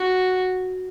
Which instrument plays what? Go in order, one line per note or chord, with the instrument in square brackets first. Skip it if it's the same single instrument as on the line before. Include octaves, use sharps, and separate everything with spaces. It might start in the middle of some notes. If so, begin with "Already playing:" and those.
Already playing: [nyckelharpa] F#4